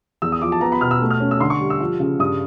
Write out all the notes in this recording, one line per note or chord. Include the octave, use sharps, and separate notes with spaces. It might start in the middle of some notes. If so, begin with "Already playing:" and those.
E2 E6
D#6
F3 D6
A5
B3 A#5
B5
B2 F6
E6
A3
F6
C#4
E6
D3 C6
C#6
G3
E6
F3
C#3
G2 D#6